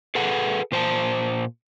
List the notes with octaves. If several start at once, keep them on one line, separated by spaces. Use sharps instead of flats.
G#4 A4 B4 F#5
A#2 C5 G#5 A5